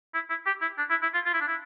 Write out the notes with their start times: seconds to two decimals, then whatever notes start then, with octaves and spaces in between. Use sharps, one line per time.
0.14 E4
0.30 E4
0.46 G4
0.62 E4
0.78 D4
0.90 E4
1.02 E4
1.14 F4
1.25 F4
1.33 E4
1.41 D4
1.48 E4